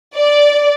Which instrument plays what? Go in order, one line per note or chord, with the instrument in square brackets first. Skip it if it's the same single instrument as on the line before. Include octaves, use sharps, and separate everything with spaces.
[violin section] D5